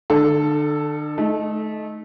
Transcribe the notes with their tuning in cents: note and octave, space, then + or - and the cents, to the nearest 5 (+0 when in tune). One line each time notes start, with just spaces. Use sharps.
D3 +40 A4 +0
A3 -25 D#4 +0